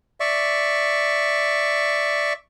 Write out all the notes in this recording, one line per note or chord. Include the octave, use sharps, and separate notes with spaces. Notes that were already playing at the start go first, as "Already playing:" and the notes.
D5 E5 C#6